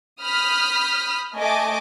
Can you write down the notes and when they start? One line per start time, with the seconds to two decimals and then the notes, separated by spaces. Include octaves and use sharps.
0.20 B5 D#6 F6 G6 B6
1.37 A3 D#5 G#5 A5 D6